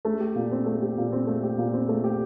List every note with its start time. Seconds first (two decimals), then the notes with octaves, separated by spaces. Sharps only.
0.05 A3
0.20 G4
0.35 A#2
0.51 C4
0.66 A3
0.82 G4
0.97 A#2
1.12 C4
1.27 A3
1.43 G4
1.58 A#2
1.74 C4
1.89 A3
2.04 G4